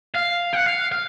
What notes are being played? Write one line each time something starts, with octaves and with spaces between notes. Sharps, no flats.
F5
F#5
F5
F5